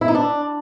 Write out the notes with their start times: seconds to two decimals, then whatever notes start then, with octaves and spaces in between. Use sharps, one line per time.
0.01 E4
0.08 D#4
0.15 D4